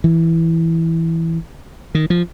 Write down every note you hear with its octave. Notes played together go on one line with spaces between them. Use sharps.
E3
D#3
F3